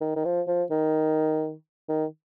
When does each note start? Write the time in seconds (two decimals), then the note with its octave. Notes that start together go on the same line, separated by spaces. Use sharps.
0.01 D#3
0.16 D#3
0.25 F3
0.47 F3
0.71 D#3
1.89 D#3